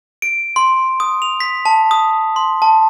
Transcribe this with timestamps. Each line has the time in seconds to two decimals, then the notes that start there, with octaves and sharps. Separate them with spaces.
0.22 D7
0.56 C6
1.00 D#6
1.22 F7
1.40 B6
1.65 A5
1.91 D#6
2.36 C6
2.62 A5